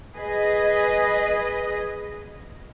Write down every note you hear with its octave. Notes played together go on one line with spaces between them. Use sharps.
G#4 B4 D#5